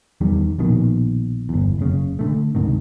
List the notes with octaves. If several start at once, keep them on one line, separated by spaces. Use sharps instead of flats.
E2 D#3 G3
A#1 B2 D#3
G1 E2
F#1 C#3
D3 D#3 A3
C#2 G#2 C3 D#3